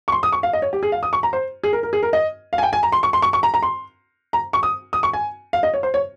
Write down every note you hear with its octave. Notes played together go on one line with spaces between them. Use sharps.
C#6
C6
D#6
C#6
F5
D#5
C#5
G4
G#4
F5
D#6
C#6
A#5
C5
G#4
A#4
A#4
G#4
A#4
D#5
F5
G#5
G5
G#5
A#5
C6
C#6
C6
C#6
C#6
A#5
A#5
C6
A#5
C#6
D#6
D#6
C#6
G#5
F5
D#5
C#5
C5
C#5